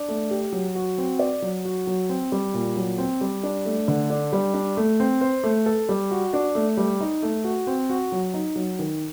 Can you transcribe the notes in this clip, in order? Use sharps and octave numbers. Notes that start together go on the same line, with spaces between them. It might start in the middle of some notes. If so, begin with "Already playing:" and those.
Already playing: D4
A3
G4
F#3
F#4
C4
D5
F#3
F#4
F#3
C4
G3
A#2
F#3
C4
G3
D4
A3
D3
D4
G3
D4
A3
C4
C5
A3
A4
G3
F#4
D4
A3
G3
D#4
A3
F#4
C4
F#4
F#3
D#4
F#3
D#3